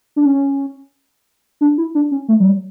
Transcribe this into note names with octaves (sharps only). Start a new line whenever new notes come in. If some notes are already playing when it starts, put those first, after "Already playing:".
D4
C#4
D4
E4
D4
C#4
A3
F#3
G3